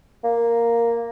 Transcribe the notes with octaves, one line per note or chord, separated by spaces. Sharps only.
A#3